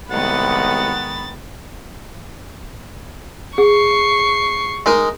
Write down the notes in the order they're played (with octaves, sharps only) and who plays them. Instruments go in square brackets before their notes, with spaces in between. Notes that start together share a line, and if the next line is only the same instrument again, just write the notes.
[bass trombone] C2 [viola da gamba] D#3 G#3 B3 [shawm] F#5 [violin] B5 A6
[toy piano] G#4 [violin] C#6 C7
[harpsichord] G#3 D#4 A#4